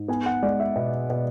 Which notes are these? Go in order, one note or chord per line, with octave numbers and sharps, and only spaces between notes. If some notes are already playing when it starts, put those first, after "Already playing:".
Already playing: G#2
B3 G#5
F#5
G#3 D5
E5
B2
B2